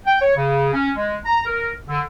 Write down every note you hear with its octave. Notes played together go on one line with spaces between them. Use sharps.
G5
C#5
C#3
C#4
G#3
A#5
A#4
D3